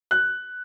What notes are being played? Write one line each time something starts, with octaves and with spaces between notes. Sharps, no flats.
F#6